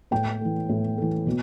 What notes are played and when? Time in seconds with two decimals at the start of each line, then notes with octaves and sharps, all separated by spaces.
0.11 A2 G5
0.41 E3 A3
0.69 A2
0.98 E3 A3
1.27 B2